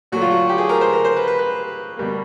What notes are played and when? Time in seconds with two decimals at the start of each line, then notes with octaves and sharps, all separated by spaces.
0.12 A#2 F#3 A3 F#4
0.21 F4
0.31 F#4
0.49 G4
0.58 G#4
0.69 A#4
0.81 C5
0.93 A#4
1.05 C5
1.16 B4
1.27 B4
1.39 B4
1.97 B2 G3 A#3